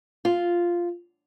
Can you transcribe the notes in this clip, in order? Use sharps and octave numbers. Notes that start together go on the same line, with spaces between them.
F4